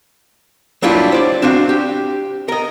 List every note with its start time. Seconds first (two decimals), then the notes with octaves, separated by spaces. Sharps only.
0.82 F#3 G3 A#3 D4 E4 F4
1.12 C5 D5
1.42 C4 D4 F#4 F5
1.69 G4
2.48 A#4 D#5